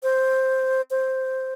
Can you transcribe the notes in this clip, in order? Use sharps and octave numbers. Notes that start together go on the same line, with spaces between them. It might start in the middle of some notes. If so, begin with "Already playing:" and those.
C5
C5